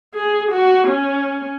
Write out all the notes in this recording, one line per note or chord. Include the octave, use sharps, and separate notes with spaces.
G#4
F#4
C#4